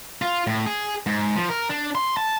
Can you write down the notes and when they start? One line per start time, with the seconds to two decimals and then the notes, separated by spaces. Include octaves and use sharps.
0.22 F4
0.47 A2
0.66 G#4
1.06 G#2
1.36 F3
1.49 A#4
1.69 D4
1.95 C6
2.17 A5